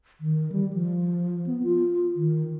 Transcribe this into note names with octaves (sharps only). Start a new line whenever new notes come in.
D#3
G3
F3
B3
F4
D#3